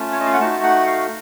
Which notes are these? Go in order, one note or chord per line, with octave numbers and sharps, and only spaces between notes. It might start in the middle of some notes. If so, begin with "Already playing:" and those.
Already playing: A3 C#4 F4 A5
C#5
D#5
F5
F#5
A3 D#4 F#4 A5
F#5
F5